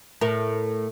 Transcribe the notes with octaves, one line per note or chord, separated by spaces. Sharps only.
A2 A#4